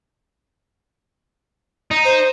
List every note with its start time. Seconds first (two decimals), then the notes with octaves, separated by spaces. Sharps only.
1.91 D#4
2.05 C5